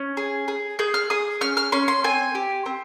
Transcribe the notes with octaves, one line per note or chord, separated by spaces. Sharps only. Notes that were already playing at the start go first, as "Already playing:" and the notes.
Already playing: C#4
G#4
G#4
G#4 G6
F6
G#4 D#6
C#4 F6
F6
C#4 C6
C6
C4 G#5
G4
C4